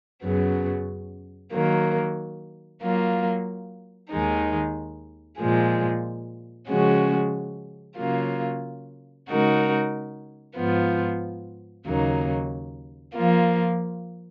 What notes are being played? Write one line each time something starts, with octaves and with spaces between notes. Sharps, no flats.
F#2 C#3 F#3 B3
D#3 F#3 A#3
F#3 A#3 F4
D#2 D#3 G#3 D#4
A#2 F3 G#3
C#3 F3 G#3 C#4 F#4
C#3 F#3 A#3 F4
C#3 G#3 D#4 F#4 A#4
G#2 F3 B3 F4
D#2 C#3 F#3 A#3 D#4
F3 A#3 F4